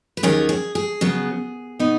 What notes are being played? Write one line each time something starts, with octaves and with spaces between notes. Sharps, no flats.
B4
D#2 D#3 F#3 C#4 G#4
G#4
G#4
C#3 F#3 B3
B2 B3 D#4